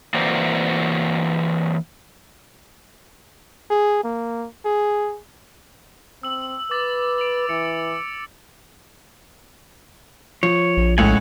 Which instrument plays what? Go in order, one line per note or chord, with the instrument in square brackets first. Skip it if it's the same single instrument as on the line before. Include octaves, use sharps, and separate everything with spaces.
[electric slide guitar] E3 A#3 C4 F#4 C5 D5
[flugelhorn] G#4
A#3
G#4
[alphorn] C4 [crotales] E6 F#7
[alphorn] B4 [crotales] D6 A6
[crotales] D7 F7 F#7
[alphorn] E3 [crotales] C#7
[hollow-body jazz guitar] F3 [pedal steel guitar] C#5
[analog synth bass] A#1
[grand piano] C#2 A2 [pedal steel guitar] C#5 F#5 G#5